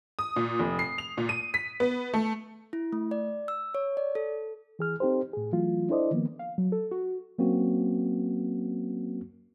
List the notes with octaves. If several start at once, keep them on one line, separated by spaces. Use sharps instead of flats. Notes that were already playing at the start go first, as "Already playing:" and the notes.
D#6
A#2
F1
C7
F7
A#2
D#7
B6
B3
A3
E4
A3
D5
E6
C#5
D5
A4
E3 G#4 F6
C4 D#4 G4 A4 C5
A2 G#4
E3 F#3 A3 F4
D4 E4 A4 C5 D5 D#5
D#3 F3 A#3 B3
F5
F#3
A4
F#4
F#3 A#3 C4 C#4 F#4